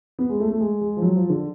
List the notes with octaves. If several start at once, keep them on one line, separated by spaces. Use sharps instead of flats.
B3
G#3
A3
A3
G#3
G#3
F3
F#3
F3
D3